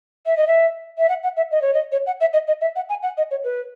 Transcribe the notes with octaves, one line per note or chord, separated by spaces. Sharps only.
E5
D#5
E5
E5
F#5
F#5
E5
D#5
C#5
D#5
C#5
F#5
E5
D#5
D#5
E5
F#5
G#5
F#5
D#5
C#5
B4